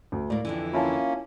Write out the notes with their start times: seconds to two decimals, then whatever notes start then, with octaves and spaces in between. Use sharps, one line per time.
0.12 D2
0.30 A2 A#3 D5
0.45 F2 D3 E3
0.73 A#3 C#4 E4 F4 A5